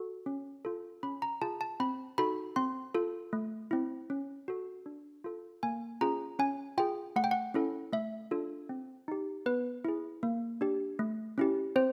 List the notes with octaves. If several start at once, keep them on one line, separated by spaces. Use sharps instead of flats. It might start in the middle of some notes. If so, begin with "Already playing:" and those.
Already playing: F#4 A4
C#4
F4 A4
C#4 B5
A#5
F4 G#4 A5
A5
C4 B5
D#4 F#4 A4 B5
C4 C6
F4 A4
A3
C4 E4
C#4
F#4 A4
D4
F4 A4
A#3 G#5
C#4 F4 G#4 A#5
C#4 G#5
F4 G#4 G5
A3 F#5
G5
F#5
C#4 E4 A4
A3 E5
D4 F4 A4
C4
D#4 G4
B3 B4
E4 G#4
A#3
D4 G4
A3
C#4 E4 G4
C4 C5